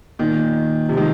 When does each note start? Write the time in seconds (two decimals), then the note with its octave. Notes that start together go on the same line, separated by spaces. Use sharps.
0.19 A#2 D#3
0.89 C3 F3
0.97 D#3 G#3